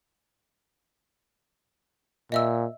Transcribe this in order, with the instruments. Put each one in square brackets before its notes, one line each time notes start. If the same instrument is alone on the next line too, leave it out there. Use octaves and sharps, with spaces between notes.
[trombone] A#2 [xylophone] D#5 E5 E6